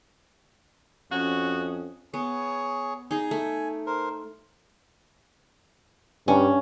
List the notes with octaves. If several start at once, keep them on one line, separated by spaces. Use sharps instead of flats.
F2 C#4 F#4 D#6
B3 G#4 C#5
D#4 G#4 G#5
A3
A#4 C5
G2 C#4